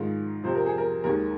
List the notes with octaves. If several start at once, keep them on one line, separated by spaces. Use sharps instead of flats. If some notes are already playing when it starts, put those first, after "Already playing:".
Already playing: G#2 D#3 G#3 F4
F2 C3 F3 C5
A#4
G#4
A#4
D#2 D#3 G#3 A#4